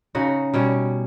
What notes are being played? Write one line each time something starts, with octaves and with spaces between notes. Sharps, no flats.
C#3 D#4 F#4
B2 G3 C#4